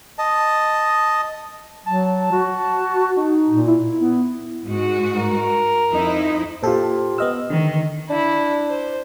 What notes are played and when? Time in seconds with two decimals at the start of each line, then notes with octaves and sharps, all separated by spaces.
0.18 D#5 A5
1.86 F#3 A5
2.32 F#4
3.16 D#4
3.49 A#2
3.67 E4
3.95 B3
4.64 G#2 F#4
5.18 A#4
5.90 F2 D#4 E4
6.63 A#2 F4 G4 A4 C5
7.18 B3 D#5 E6 F6
7.50 D3 D#3
8.10 D4 E4
8.70 C5